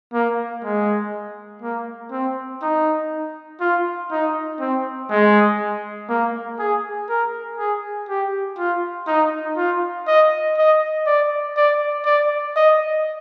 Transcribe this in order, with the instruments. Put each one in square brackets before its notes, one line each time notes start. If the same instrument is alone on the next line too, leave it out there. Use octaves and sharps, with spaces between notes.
[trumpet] A#3
G#3
A#3
C4
D#4
F4
D#4
C4
G#3
A#3
G#4
A#4
G#4
G4
F4
D#4
F4
D#5
D#5
D5
D5
D5
D#5